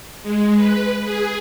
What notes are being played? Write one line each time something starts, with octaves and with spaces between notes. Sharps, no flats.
G#3
B4
G#4